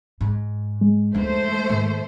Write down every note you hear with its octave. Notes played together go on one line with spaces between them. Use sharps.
G#2
G#3
D2 A3 D#4 C5
G#2 D#3